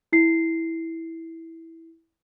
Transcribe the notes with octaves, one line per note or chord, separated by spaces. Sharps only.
E4 C7